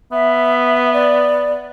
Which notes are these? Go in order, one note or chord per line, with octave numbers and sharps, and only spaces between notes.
B3 E5
D5